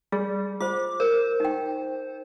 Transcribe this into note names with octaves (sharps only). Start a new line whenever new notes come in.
G3 G#4
F4 C5 D6
A#4 C5
D#4 G5